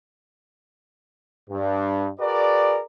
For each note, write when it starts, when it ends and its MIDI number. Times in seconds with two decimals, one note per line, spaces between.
1.50 2.08 43
2.20 2.80 66
2.20 2.80 68
2.20 2.80 70
2.20 2.80 71
2.20 2.80 74